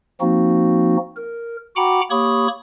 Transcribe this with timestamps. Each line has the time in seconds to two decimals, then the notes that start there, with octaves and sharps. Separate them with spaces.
0.21 F3 A#3 C4 D#4 F#4
1.16 A#4
1.76 F#4 F#5 G5 A#5 B5 D6
2.10 A#3 G4 C#5 B5 C#6 D#6